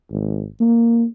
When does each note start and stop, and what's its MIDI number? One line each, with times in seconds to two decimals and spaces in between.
0.11 0.45 32
0.60 1.05 58